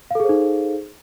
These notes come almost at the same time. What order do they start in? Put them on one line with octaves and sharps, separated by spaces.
F5 A4 G#4 C5 D#4